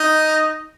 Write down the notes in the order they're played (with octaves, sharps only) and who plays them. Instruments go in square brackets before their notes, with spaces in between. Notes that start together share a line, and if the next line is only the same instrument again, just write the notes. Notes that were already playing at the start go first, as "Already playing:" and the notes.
Already playing: [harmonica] D#4 D#5